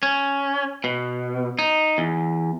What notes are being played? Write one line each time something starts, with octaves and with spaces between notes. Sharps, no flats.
C#4
B2
D#4
E2